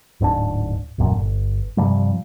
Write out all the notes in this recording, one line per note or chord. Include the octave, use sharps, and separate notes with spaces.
D1 G#2 B3 D4
D#1 A1 F#2 A#2
G1
G2 C3 F3 G3